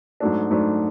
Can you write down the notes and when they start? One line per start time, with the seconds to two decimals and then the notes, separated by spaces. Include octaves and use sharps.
0.20 G#2 F#3 A3 D4
0.51 G#2 F#3 A3 D4